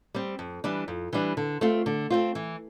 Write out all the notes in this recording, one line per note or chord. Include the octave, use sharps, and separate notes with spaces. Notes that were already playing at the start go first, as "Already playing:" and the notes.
G3 C4
F2
E3 G3 D4
F2
E3 G3 D4
D3
A3 C4 F4
D3
A3 C4 F4
E3